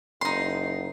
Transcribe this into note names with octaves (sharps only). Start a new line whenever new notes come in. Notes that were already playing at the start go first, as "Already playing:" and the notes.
F#1 D#4 C6